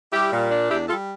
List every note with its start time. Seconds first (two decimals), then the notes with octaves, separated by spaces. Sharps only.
0.12 G3 E4 G4
0.32 A#2
0.51 D4
0.69 E2 E4 G4
0.88 G3 F4 A4